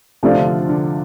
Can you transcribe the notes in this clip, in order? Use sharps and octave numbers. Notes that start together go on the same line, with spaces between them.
C3 F3 A3 D4 F4 D5
D3
F3
D3